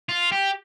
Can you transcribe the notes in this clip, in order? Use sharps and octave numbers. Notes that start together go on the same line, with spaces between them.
F4
G4